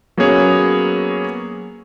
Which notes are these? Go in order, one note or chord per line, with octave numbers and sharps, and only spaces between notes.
F#3 A#3 B3 C#4 G#4 C#5